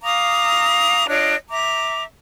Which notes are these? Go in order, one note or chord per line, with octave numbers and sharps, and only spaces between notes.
F5 A#5 D6 D#6
D4 F4 C#5 D#5
E5 A#5 D6